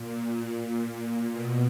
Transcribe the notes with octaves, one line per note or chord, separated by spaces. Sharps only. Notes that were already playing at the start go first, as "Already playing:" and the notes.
Already playing: A#2
B2